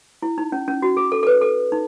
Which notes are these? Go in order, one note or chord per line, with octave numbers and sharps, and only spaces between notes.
E4
D#4
C#4
C#4
F#4
G#4
A4
A4
B4
A4
D#4